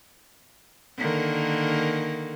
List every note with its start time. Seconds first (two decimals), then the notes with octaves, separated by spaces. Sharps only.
0.98 D3 D#3 A#3